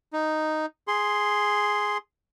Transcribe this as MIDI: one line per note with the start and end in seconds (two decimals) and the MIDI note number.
0.13 0.66 63
0.88 1.98 68
0.88 1.98 84